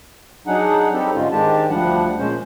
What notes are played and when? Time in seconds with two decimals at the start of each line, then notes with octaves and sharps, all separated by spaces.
0.47 F#3 D4 D#4 G#4 F#5
0.93 G3 C4 D#4 G4 A4
1.15 G#2 D3 G#3 C#4 F4
1.31 G#2 D#3 G#3 D4 G4 A5
1.69 D2 F3 G3 D4 F#5
2.18 A#2 G#3 C#4 C5